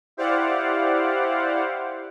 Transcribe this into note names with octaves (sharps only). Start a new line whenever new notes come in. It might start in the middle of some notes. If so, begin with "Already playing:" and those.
E4 G4 C5 D5 F5 F#5